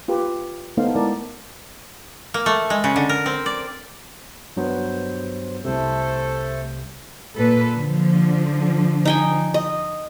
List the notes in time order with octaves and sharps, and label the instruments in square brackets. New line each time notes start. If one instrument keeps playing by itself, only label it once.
[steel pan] F4 G4 B4
A3 B3 D#4 C5 F5
G#3 E4 A#4 D5 A5
[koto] A#3
A3
G#3
C#3
D3
A#4
C4
D5
[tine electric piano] G2 F#3 B3 [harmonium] C5
[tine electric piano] C2 C3 [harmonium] A3 A4 C5
[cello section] A#2 A4 B4
D3 F3
[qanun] D#4 G5 G#5
D#5